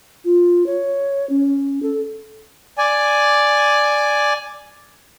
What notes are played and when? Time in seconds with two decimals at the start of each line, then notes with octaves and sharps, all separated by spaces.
0.25 F4
0.66 C#5
1.30 C#4
1.83 A4
2.78 D5 G#5